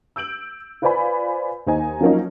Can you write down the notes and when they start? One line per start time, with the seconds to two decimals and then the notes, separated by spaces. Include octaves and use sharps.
0.16 E6 G6 D7 F#7
0.82 F4 B4 C5 D5 G#5 B5
1.67 D#2 D#4 C5 G#5
2.01 F3 F#3 A#3 C#4 D#4